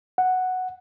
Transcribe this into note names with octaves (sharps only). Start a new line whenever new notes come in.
F#5